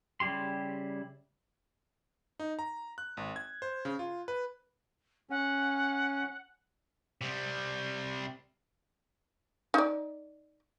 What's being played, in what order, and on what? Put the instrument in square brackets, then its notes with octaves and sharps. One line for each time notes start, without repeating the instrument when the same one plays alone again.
[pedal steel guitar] C#3 G3 E4 G4 C6
[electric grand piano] D#4
A#5
F#6
G#1
G#6
C5
C#3
F4
B4
[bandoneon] C#4 [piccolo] F#5
[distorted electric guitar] C3 G3
[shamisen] D#4 D5